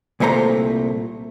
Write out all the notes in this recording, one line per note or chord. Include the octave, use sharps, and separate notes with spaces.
C2 A#2 A3 C5 A#5